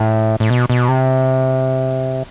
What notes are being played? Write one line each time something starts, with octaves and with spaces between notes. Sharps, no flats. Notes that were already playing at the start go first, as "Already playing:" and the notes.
Already playing: A2
A2
B2
B2
C3